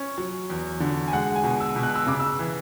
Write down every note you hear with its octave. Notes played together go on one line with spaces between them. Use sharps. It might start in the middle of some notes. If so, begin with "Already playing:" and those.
Already playing: C#4
F#3
E2
D3
G#5
G#3 F#5
G#5
B2
E6
B2
F#6
E6
C#3 D6
E6
E3